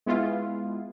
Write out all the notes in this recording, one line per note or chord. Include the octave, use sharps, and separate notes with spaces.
G#3 B3 E4 F4